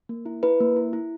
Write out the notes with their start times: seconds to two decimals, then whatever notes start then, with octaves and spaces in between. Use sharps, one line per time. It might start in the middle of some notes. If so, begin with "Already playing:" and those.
0.09 A#3
0.26 E4
0.43 E4 B4
0.60 A#3
0.76 E4
0.93 E4